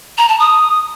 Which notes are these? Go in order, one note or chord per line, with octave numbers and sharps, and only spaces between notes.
A#5
A5
D#6